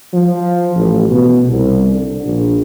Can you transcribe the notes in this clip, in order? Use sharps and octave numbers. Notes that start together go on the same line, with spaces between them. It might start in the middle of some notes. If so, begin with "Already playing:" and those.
F3
A1
B2
C2
D3
A#1